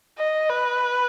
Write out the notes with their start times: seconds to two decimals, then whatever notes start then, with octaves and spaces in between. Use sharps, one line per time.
0.18 D#5
0.49 B4